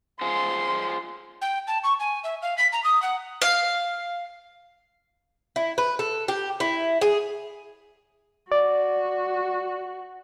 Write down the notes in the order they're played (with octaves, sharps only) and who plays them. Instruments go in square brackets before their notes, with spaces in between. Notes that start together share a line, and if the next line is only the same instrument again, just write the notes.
[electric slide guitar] F4 G#4 C5 [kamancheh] C6
[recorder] G5
A5
C#6
G#5
E5
F5
B6
A#5
D#6
F#5
[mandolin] F5
[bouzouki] E4
B4
A4
G4
E4
G#4
[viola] F#4 [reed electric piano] D5